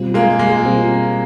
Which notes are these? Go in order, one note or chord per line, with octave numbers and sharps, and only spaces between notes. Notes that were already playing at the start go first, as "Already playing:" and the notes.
Already playing: B2 G3 C4 F4
G#3 A#3
G#3 A#3
B2 G3 C4 F4